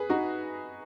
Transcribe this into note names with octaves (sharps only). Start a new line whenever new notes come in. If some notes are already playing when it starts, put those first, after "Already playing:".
Already playing: G#4 B4
D#4 F#4